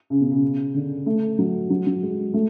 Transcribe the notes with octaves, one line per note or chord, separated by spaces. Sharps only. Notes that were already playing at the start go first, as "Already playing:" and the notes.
C#3
B2
C#3
D3
A3
F#3
F#3
F#3
G#3
A3